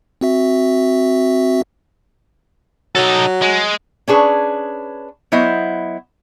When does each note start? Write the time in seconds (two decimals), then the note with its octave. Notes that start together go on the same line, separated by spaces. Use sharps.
0.21 C4 F#4 E5
2.95 F#3 D#4 A4
3.42 G#3
4.08 C#4 D4 G#4 B4
5.32 F#3 B3 E4 C5 D#5